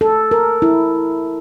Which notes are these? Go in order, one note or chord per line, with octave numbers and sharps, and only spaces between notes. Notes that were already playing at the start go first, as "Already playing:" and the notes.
A4
A#4
E4